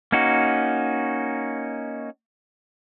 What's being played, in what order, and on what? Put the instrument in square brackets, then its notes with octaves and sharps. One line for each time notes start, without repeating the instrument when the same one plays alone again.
[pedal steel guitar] A#3 C#4 D#4 F#4